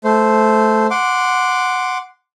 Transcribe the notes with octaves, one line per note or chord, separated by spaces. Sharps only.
A3 C5
F#5 C6 D6